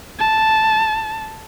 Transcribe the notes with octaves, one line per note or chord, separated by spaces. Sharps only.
A5